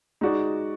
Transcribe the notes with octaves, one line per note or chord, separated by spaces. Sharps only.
G#3 D#4 F#4 D5